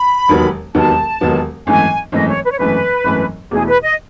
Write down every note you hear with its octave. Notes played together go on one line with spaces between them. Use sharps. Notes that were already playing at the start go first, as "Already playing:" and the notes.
Already playing: B5
E1 D#2 D#3 F#3 B3
E1 D#2 D#3 F#3 B3 A5
E1 D#2 D#3 F#3 B3
G#1 F#2 E3 A3 G#5
G#1 F#2 E3 A3 D#5
C#5
B4
C#5
G#1 F#2 E3 A3 B4
G#1 F#2 E3 A3
E2 B2 A3 E4 G#4
B4
D#5